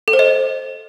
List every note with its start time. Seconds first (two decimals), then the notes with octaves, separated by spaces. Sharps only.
0.08 A4
0.13 C5
0.19 D#5